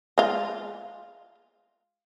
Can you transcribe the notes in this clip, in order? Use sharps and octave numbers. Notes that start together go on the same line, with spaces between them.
G#3 F4